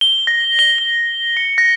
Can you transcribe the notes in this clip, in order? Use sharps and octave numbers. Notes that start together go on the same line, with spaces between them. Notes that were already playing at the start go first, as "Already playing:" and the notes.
G7
A#6
G7
G7
C#7
A#6